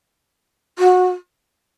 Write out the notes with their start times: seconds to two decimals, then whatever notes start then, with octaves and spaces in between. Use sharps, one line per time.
0.79 F#4